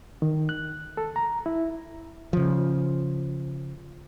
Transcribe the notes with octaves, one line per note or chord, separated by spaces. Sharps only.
D#3
F#6
A4
A#5
E4
C#3 F3